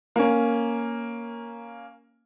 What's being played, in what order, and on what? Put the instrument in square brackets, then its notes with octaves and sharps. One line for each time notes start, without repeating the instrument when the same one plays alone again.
[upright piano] A#3 C#4